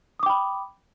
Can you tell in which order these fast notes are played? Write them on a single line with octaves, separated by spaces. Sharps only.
D#6 D6 G5 B5